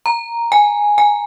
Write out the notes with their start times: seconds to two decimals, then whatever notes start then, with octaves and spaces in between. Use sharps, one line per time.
0.06 A#5
0.52 G#5
0.98 G#5